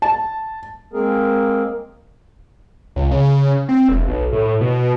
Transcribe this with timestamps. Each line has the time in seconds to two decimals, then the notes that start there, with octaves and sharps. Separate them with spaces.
0.02 A5
0.93 G#3 A#3 C4 G#4 A#4
2.96 C#2
3.11 C#3
3.69 C4
3.89 E1
4.08 B1
4.33 A2
4.61 B2